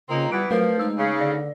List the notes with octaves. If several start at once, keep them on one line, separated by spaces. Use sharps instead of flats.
C#3 A#3 C4 D#4 F4
E3 G3 B3 D7
F3 F#3 A3 A#4 B4
G#3 D#4 E6
C#3
D3 D5